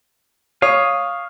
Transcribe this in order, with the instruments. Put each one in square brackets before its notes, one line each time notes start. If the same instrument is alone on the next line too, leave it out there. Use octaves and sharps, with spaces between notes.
[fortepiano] C#5 [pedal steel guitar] F5 D#6